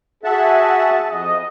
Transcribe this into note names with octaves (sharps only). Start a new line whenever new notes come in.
F#4 G#4 E5 F#5 A5
F2 D#5